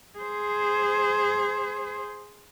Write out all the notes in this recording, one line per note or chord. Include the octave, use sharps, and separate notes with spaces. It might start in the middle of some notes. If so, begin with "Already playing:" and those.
G#4 C5